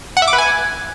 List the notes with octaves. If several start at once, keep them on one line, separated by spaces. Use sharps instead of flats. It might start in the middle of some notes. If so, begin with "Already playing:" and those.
F#5
E5
D6
B4
G#5